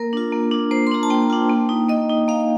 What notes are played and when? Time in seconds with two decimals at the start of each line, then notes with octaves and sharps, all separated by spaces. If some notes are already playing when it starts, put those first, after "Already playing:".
Already playing: A#3 A#4
0.13 D4 F4
0.32 A#3
0.51 D4 F4
0.71 A#3 C5
0.87 C6
0.92 D4 F4 A#5
1.03 A5
1.10 A#3 G5
1.30 D4 F4
1.49 A#3
1.69 D#4
1.89 A#3 D#5
2.09 D#4
2.28 A#3 F5